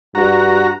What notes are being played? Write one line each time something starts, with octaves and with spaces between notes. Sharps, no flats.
G2 F#4 A#5